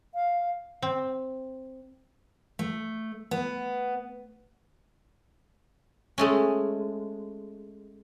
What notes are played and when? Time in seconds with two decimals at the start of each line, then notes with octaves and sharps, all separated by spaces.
0.15 F5
0.82 C4
2.59 A3
3.31 B3
6.18 G#3 A3 C#4